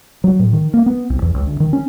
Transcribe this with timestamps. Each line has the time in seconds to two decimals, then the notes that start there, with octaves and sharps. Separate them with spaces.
0.24 F#3
0.39 A2
0.53 D#3
0.74 A#3
0.86 B3
1.10 C2
1.22 E2
1.34 C#2
1.47 D2
1.60 D#3
1.73 C#4